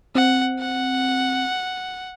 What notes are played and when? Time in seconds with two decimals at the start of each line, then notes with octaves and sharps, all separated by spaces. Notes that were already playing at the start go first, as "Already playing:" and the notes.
0.15 C4 F#5
0.60 F#5